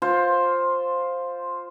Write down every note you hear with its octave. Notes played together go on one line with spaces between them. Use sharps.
F4 C5